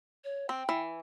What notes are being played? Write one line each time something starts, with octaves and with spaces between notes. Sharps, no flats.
C#5
C4 G5
E3